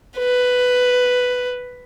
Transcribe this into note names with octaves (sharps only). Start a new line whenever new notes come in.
B4